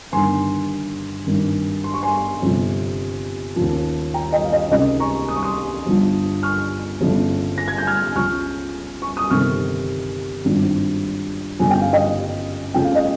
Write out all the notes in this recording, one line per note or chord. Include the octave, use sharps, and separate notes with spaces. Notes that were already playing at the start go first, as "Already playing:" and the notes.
G1 G2 D#3 G#5 C6
G#1 G2 D#3
C6
C#6
G#5 C6
G1 F2 C3 F3
D#2 C#3 F3
G5 A#5
D#5 G5
F5
D#5
C#2 C3 D#3 D#5
A#5 C#6
D#6
C#6
C6 D#6
G1 G2 F3
C#6 F6
G1 F2 C#3 F3
A#6
G#6
G6
F6 G#6
C#2 C#3 F3 C#6 F6
C#6
D#6
G1 F2 C3 D#3 C#6 F6
G#1 G2 F3
G1 F2 C#3 F3 G#5
G5
F5
D#5 G5
F1 F2 C#3 F3 G5
F5
D#5